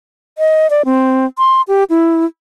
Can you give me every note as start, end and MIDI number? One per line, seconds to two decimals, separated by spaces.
0.38 0.70 75
0.70 0.82 74
0.85 1.26 60
1.38 1.62 84
1.68 1.84 67
1.90 2.25 64